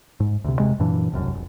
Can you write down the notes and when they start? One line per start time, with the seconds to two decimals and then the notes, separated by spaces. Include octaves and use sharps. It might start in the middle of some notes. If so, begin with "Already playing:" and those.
0.20 G#2
0.44 D2 C3
0.59 E1 C3 G#3
0.79 F#2 A#2 E3 D4
1.12 E1 C2 F#2
1.34 F1